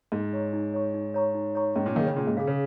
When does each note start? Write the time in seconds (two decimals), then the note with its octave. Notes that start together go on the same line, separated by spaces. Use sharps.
0.12 G#2 D#4
0.33 C#5 A#5 C#6
0.53 D#4
0.74 C#5 A#5 C#6
0.94 D#4
1.14 C#5 A#5 C#6
1.35 D#4
1.55 C#5 A#5 C#6
1.76 G#2 C#4
1.86 A#2
1.96 D#3 G#4 F5
2.06 C#3
2.16 A#2 C#4
2.27 G#2
2.37 C#3 G#4 F5
2.47 C#3